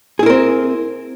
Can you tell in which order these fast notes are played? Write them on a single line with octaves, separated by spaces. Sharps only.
G#4 E4 A#4 C4